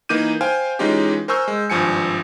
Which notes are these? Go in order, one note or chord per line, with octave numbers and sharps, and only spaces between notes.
E3 A#3 D#4 D6 G6 D#7
C5 F5 G5 G#5
E3 G#3 C#4 D#4 F4 G4
A#4 C5 G#5 C#6 E6 G6
G#3
G#1 G2 F3 G#5 C#7